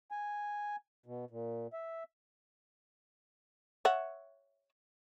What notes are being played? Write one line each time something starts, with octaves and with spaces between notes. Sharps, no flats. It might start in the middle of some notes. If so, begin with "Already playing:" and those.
G#5
B2
A#2
E5
C#5 E5 F#5